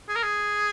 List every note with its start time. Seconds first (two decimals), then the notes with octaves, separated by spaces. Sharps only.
0.09 G#4
0.16 A#4
0.23 G#4